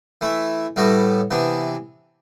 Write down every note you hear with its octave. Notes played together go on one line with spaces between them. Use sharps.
E3 A3 E4
A2 G3 B3 F#4 A4
C3 E3 B3 D4